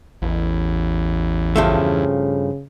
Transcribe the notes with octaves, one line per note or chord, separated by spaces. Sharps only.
A1 E2
G2 C#3 F3 A3